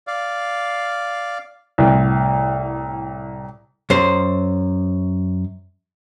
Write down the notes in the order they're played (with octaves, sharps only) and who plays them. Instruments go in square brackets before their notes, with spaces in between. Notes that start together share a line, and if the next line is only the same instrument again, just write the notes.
[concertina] D5 F5
[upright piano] C2 A2
[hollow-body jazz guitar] F#2 C5